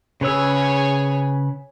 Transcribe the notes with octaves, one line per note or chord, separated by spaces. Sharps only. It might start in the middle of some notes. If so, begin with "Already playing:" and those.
C#3 G#4 B4 C#5 E6